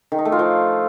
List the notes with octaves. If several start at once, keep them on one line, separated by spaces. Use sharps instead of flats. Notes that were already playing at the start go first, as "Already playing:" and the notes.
D#3
D#4
A3
F4
F3